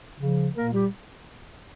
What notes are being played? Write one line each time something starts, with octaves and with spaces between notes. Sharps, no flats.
C#3 F3
A#2 A#3 A#4
G3 G4